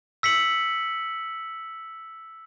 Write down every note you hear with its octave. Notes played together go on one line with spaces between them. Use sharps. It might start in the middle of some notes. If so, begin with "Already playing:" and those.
E6 B6 C#7 F#7